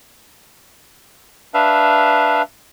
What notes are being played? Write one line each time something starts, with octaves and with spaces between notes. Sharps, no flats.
D4 B4 E5 F5